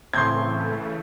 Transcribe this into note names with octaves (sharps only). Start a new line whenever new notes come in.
A2 C#3 E3 A3 C4 C6 G6 G#6